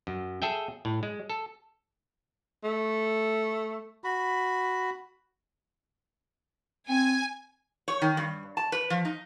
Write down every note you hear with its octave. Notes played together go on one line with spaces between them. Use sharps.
F#2
G#4 A4 E5 G5
A2
G#3
A4
A3
F#4 B5
C4 G#5
C#5
D#3
G2
A5
B4
F3
D#4